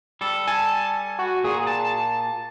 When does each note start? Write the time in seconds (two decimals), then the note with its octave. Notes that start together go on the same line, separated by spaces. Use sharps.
0.21 G3 A4
0.48 G#5 A5
1.19 F#4
1.44 A#2 G#4
1.67 A5